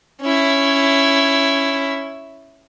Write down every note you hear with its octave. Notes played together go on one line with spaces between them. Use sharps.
C#4 E4